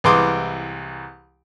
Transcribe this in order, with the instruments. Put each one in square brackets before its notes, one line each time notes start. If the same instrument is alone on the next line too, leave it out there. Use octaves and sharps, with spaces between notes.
[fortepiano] C2 E3 G#3 C6 D6 D#6